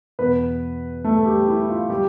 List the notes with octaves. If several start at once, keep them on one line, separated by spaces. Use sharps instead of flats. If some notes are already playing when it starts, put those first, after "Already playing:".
E2 B2 B3 B4
A3 A4
A4
G3 G4
E4
F4
G3 G4